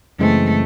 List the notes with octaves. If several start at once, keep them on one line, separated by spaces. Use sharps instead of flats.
F#2 C#3 E3 G#3 A3 C4